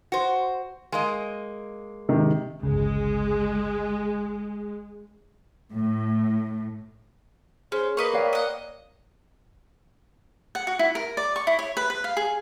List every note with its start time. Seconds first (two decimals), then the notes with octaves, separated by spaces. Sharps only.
0.12 F#4 C5
0.92 G#3 A#3 D#5
2.08 G#2 C3 D#3
2.63 G1 C#2 C#3 G#3
5.73 A2
7.72 C#4 G#4 C5
7.97 A#3 B4 D#5 C#6
8.13 C#5 D5 F5 G5
8.33 D#5 F#5
10.55 F#5
10.67 F#4
10.79 E4
10.95 A#4
11.17 D5
11.36 C#6
11.47 E4
11.59 C#5
11.77 B4
11.90 B4
12.04 F5
12.17 G#4